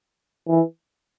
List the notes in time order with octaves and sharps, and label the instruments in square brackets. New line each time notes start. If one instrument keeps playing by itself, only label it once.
[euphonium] E3